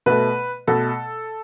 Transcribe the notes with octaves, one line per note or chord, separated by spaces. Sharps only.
B2 A3 B4
B2 A3 A4